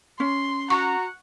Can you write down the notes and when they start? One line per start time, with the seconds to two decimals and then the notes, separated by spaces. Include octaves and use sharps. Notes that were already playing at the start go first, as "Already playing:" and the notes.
0.20 C#4 C6
0.70 F#4 F#5 A#5 C#6